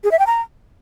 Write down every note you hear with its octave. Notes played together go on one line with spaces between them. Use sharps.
G#4
E5
G5
A#5